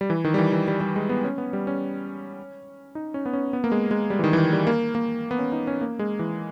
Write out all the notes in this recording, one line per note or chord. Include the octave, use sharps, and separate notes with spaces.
G3
E3
D#3
G3
E3
E3
G3
G3
G#3
B3
C#4
B3
G3
C#4
D#4
C#4
B3
C#4
B3
A#3
G#3
G#3
G3
E3
D#3
E3
D#3
G3
A#3
A#3
B3
C#4
D#4
C#4
A#3
G#3
E3